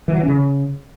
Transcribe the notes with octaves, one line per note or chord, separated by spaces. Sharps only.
E3
F#3
E3
C#4
C#3